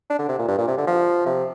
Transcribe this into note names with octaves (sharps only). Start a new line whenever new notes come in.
D4
D3
C3
A#2
G2
A#2
C3
D3
F3
C3